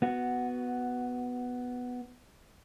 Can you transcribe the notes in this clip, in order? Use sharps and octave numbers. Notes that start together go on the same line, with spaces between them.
B3 F#4